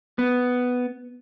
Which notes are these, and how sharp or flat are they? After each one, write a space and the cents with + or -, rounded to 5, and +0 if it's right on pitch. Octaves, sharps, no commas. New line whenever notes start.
B3 +5